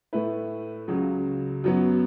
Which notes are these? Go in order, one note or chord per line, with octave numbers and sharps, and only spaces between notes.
A2 A3 E4 B4
C#2 C#3 F#3
F#2 F#3 B3